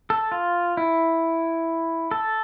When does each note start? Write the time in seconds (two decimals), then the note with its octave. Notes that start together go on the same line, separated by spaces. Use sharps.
0.10 A4
0.32 F4
0.77 E4
2.11 A4